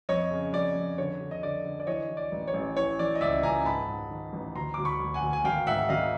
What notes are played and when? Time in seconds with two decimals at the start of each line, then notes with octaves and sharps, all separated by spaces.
0.09 F2 C#5 D#5
0.31 C#3
0.53 F2 D5
0.75 F2
0.98 D3 C#5
1.20 D3
1.31 D#5
1.43 D3 D5
1.65 D3
1.80 D5
1.87 E3 C#5 D#5
2.09 E3
2.17 D5
2.32 A1
2.47 C#5
2.54 A1
2.76 E3 C#5
2.99 E3 D5
3.15 D#5
3.21 C#2 D5 E5
3.43 C#2 G#5 A#5
3.65 G#2 A5 B5
3.88 G#2
4.11 D#3
4.33 A1
4.55 D2 A#5 C6
4.74 D2 D6
4.85 B5 C#6
5.00 D2
5.14 F#5 G#5
5.22 D2
5.33 G#5
5.44 G#1 F5 G5
5.67 G#2 E5 F#5
5.89 G#1 D#5 F5